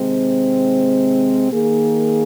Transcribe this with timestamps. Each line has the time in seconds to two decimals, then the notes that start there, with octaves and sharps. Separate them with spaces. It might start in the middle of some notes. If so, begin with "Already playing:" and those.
Already playing: C3 D#3 G#3 C4
1.52 D#3 A#3 G#4